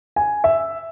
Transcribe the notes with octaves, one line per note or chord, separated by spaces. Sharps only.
G#5
E5